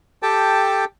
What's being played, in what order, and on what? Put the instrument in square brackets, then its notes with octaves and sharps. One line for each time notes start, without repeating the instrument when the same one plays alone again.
[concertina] G4 A4 G5 A5